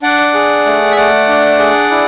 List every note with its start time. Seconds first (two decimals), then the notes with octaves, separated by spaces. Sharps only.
0.03 D4 D5 F#5
0.34 G#4
0.66 A3
0.91 E5
0.96 A3 D5 F#5
1.29 D4
1.59 G#4
1.91 E4